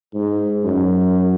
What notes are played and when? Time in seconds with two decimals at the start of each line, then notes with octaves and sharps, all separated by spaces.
0.14 G#2
0.64 F#2